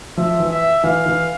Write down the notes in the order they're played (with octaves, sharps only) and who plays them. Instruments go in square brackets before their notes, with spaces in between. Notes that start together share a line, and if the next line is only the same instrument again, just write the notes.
[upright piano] F3 [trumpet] E5
[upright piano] E3
[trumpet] E5
[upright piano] E3 [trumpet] F5
[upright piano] E3